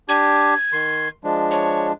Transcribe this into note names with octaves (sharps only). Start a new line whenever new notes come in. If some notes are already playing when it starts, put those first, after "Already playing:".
D4 G4 G#6
D#3 C6
F3 G#3 D4
C#5